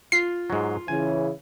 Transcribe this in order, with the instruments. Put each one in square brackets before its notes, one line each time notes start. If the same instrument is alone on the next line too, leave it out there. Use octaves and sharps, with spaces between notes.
[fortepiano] F4 [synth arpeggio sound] C7
[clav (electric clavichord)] G#2 F#3
[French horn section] C#3 E3 [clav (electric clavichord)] G#5